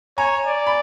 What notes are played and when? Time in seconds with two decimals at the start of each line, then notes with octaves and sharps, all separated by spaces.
0.17 C#5 G#5 A#5
0.46 D5
0.67 B5